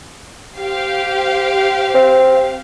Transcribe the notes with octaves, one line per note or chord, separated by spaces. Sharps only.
G4 C5 F5
C4